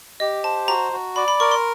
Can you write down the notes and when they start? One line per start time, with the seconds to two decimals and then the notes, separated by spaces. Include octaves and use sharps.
0.20 G4 D#5
0.44 C5 A5
0.68 F#4 A#5
0.93 F#4
1.16 D5 B5
1.28 B5
1.40 A#4 C#6
1.51 C6